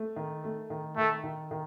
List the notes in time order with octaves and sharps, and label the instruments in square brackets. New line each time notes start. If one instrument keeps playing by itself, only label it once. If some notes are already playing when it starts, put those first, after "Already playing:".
Already playing: [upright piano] A3
D#3
A3
D#3
[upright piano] D#3 [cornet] A3
[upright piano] D#3
D#3